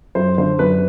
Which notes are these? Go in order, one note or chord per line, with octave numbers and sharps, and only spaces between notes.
F#2 C5
D3 C5
F#2 B4